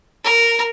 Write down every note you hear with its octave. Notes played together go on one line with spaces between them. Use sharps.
A#4